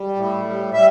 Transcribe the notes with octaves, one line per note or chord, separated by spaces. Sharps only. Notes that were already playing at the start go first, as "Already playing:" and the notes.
Already playing: G3
A2
G3
G3 E5